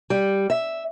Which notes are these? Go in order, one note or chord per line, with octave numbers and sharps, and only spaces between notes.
G3
E5